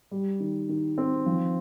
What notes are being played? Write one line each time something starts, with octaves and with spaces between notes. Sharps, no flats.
G3
D#3
D#3
C4
F3